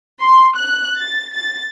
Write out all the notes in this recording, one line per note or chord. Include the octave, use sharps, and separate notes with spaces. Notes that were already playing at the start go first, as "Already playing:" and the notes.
C6
F#6
A6
A6